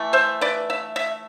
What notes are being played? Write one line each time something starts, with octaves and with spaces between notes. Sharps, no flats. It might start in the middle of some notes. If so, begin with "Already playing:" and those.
Already playing: E3 A3
C5 E5
B4 D5
E5
E5